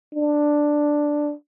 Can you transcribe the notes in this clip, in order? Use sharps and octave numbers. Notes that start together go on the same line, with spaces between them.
D4